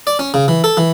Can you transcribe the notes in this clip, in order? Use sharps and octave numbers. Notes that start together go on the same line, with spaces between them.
D5
C#4
C#3
E3
A4
E3